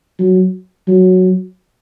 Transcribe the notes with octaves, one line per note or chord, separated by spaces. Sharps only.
F#3
F#3